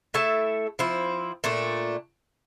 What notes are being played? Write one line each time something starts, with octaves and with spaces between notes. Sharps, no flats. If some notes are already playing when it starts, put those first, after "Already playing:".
A3 E4 A4 E5
F3 C4 E4
A#2 A3 D4